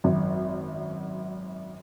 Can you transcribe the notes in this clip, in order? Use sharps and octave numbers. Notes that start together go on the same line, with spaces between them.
G#1 F#2